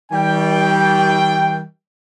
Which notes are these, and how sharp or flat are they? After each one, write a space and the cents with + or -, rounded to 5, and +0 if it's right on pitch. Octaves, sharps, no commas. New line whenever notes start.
D#3 +40 G3 -15 G5 +5